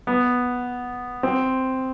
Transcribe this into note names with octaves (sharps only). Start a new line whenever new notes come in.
B3
C4